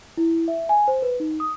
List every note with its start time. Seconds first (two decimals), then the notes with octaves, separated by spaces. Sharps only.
0.17 E4
0.48 E5
0.69 G#5
0.88 C5
1.02 B4
1.20 D#4
1.40 D#6